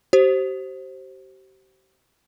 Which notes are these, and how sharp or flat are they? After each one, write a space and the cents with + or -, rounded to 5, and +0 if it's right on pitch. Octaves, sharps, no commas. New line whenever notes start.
G4 -40 C5 +15